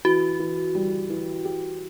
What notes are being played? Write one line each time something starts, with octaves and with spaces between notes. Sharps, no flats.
E3 F#4
E3
G3
E3
G4